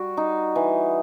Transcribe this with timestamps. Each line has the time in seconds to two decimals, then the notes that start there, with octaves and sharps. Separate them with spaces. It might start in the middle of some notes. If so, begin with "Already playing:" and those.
Already playing: G3 F#4
0.17 D#4
0.56 E3